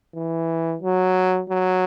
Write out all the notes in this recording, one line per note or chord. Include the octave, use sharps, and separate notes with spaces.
E3
F#3
F#3